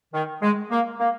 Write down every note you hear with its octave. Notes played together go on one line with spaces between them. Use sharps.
D#3
G#3
A#3
A#3